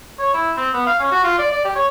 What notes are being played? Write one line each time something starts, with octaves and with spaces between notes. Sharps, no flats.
C#5
E4
C4
B3
F5
C#4
F#4
F4
D5
D5
G4
C#5